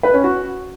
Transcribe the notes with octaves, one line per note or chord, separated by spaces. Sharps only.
B4
C#4
F#4